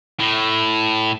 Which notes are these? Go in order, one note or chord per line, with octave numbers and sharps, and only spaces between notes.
A2